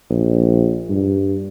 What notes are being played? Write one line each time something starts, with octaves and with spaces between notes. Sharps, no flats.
A#1
G2